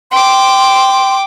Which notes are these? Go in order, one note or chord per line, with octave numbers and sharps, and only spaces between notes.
G5 C6 D6